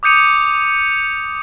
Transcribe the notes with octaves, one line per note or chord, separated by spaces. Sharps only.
D6 D#6 G6 C#7 D#7 F7